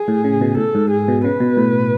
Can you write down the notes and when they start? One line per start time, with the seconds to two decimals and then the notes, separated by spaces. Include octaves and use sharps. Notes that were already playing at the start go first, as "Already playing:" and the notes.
Already playing: G#4
0.08 A2
0.24 C#3
0.41 B2
0.57 A2 A4
0.75 G#2
0.90 G#4
1.08 B2
1.24 C#3 B4
1.40 B2
1.57 A2